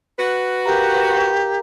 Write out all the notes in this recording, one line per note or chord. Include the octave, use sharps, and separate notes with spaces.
F#4 B4
G4 A#4 F5 A#5